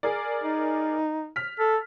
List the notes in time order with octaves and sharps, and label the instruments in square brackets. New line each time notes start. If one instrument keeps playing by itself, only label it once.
[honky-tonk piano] G#4 A#4 D5
[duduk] D#4
[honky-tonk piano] F6 B6
[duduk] A4